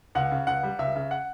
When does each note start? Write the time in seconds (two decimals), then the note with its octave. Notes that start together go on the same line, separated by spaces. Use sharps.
0.15 C#2 F#5
0.31 C#3
0.47 C#2 F#5
0.63 G3
0.79 C#2 E5
0.96 C#3
1.11 F#5